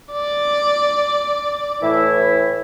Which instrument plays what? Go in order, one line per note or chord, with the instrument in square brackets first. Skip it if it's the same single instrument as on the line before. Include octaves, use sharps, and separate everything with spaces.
[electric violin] D5
[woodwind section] A2 E3 E4